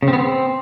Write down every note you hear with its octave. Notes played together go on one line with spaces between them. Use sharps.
C#3
C4
B3
C4